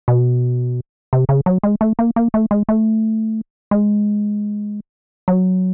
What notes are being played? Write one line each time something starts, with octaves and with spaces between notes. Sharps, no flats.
B2
C3
C#3
F#3
G#3
A3
A#3
A#3
A3
G#3
A3
G#3
F#3